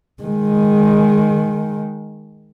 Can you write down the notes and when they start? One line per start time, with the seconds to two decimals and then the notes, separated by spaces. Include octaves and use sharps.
0.23 D#3 G#3